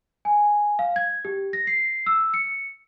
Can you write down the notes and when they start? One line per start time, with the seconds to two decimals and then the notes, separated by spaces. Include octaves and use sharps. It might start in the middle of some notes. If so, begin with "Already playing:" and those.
0.25 G#5
0.79 F5
0.96 G#6
1.25 G4
1.53 A#6
1.67 C7
2.06 E6
2.34 C#7